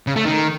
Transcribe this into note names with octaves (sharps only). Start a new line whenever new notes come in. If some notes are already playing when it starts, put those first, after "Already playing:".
C#3
A3
D#3